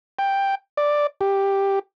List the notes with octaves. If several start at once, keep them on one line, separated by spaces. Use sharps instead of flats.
G5
D5
G4